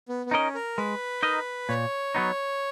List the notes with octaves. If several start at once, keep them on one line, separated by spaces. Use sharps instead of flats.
B3
B3
C#4 D#4 A#4 D#5
A#4
G#3 B4
D#4 A#4 D#5
A#2 C#5
F#3 B3 D#4